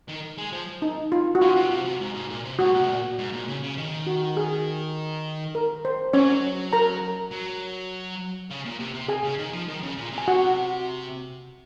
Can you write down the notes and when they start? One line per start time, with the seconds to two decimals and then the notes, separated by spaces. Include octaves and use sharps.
0.08 D#3
0.38 G#3
0.52 F3
0.82 D#4
1.12 F4
1.35 F#4
1.41 C#3 F4
1.56 C3
1.71 C3
1.85 C3
2.00 G#2
2.15 G#2
2.30 A#2
2.45 C3
2.59 G#2 F#4
2.74 A#2
2.81 C3
2.88 A#2
3.19 G#2
3.33 A#2
3.48 C#3
3.63 C#3
3.78 D#3
4.07 F#4
4.37 G#4
5.55 A#4
5.85 C5
6.13 F#3 C#4 C#5
6.73 A#4 A#5
7.32 F#3
8.50 C#3
8.65 A#2
8.80 C3
8.94 C3
9.08 G#4 G#5
9.24 C#3
9.39 D#3
9.53 F3
9.68 D#3
9.83 C#3
9.97 A#2
10.12 C3
10.18 G#5
10.28 F#4 F#5